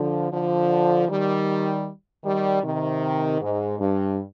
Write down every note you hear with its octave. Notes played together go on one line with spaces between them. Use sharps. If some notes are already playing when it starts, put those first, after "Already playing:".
Already playing: D3 F3
D3 F3
D#3 G3
D#3 G3
C3 D#3
G#2
G2